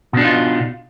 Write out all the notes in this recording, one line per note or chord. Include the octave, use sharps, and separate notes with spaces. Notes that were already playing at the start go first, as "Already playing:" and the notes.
B2 D4 D#4 F4